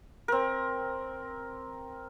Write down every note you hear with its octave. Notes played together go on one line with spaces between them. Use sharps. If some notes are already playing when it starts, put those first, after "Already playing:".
C4 A#4